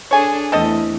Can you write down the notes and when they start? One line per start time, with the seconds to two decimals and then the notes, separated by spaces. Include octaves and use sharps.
0.11 D4 G#4 A4 C#5 G#5
0.52 E2 A3 C4 A4 D#5